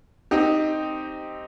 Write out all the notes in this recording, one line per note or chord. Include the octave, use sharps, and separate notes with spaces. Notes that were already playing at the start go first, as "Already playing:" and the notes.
C4 D#4 G4